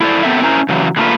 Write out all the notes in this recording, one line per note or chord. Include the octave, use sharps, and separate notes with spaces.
E4 A4 C5 D5
A3 B3 C4 A4 A#4 E5
C#4 E4 A#4 C5 A#5
C#3 E3 F#3
D3 F#3 A3 A#3 F4 B4